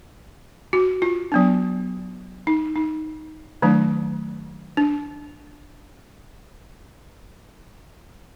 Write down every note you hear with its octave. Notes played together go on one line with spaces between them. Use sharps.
F#4
F4
F#3 B3 D4
D#4
D#4
D#3 F#3 A3 D4
D4